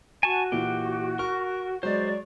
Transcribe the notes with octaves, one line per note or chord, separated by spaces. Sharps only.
F#4 G#5 A5 C#6
A#2 E3 E4 G4
A#4 C#6
F#3 G#3 C5 D5 C#6